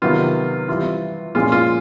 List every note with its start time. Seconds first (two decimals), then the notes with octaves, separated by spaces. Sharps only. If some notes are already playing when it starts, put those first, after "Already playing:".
0.02 C3 D#3 F#3 B3 F4
0.68 E3 G3 C4 F4
1.35 A#2 F3 G#3 C#4 F4
1.52 F4